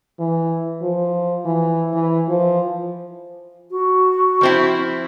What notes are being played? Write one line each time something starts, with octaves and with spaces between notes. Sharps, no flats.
E3
F3
E3
E3
F3
F#4
F3 C4 E4